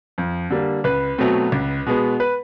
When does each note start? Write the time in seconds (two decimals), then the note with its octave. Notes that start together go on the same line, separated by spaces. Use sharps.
0.18 F2
0.50 D3 G3 A#3
0.84 C#2 B4
1.18 B2 F#3 A3 C4
1.52 C#2
1.86 B2 G#3 B3
2.20 B4